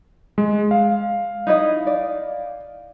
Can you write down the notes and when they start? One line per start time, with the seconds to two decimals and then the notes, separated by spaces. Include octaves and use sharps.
0.38 G#3
0.71 F5
1.47 D#4 E4 D#5
1.87 D5